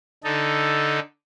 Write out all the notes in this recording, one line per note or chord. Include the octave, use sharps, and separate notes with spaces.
D3 D#4 A4